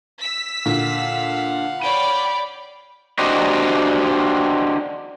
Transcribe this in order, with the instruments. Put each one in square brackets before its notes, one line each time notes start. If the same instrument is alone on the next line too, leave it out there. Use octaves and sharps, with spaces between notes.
[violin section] E6 B6
[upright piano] A#2 D3 [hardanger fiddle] F5 F#5
[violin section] C#5 D5 G5 [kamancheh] B5 [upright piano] D#7
[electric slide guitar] D4 F#4 G4 C5 D#5